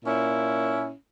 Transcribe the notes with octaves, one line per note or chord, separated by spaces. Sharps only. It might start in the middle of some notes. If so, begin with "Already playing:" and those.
A#2 C#4 E4